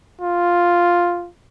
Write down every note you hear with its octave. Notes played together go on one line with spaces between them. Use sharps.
F4